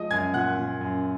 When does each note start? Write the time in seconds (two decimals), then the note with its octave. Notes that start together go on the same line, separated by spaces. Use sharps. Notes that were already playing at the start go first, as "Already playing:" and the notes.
Already playing: F3 G#3 D#5 D#6
0.11 F#2 G#5 G#6
0.34 A#2 F#5 F#6
0.58 A#2
0.81 F#2